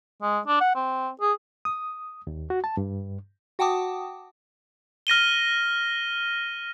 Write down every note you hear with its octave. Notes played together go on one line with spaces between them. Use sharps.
G#3
D4
F#5
C4
G#4
D#6
D#2
F#4
A5
G2
F#4 F#5 G5 A5 D6 D#6
F6 A#6 D#7 G7